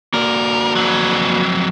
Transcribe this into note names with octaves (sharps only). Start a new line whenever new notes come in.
A#3 F#4 A#4 D5
F2 F#3